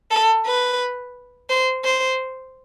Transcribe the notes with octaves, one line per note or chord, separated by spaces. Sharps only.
A4
B4
C5
C5